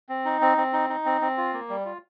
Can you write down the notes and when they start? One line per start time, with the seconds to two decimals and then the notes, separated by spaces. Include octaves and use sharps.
0.09 C4
0.25 D#4
0.41 C4
0.57 C4
0.73 D#4
0.89 D#4
1.05 C4
1.21 C4
1.37 F4
1.53 A#3
1.69 G3
1.86 F4